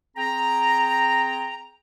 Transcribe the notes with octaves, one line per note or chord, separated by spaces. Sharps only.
C4 G#4 G5 A#5